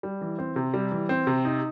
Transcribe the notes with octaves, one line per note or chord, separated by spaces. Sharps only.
G3
E3
C4
C3
G3
E3
C4
C3
D#4